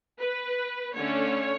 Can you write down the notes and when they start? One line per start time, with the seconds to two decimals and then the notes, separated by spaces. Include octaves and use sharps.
0.20 B4
0.94 D3 A3 C#4 C#5